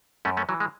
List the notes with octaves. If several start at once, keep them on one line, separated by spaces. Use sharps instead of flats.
F#2 A3 C#4
A3 C#4
E3 F#3
G#3